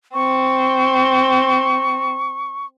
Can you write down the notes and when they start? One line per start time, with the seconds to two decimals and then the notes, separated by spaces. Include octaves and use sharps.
0.14 C4 C#6